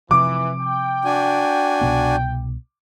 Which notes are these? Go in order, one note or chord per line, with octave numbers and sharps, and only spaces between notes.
C3 E3 F3 D6
G5
D4 F#4 G#5
C2 B2 B3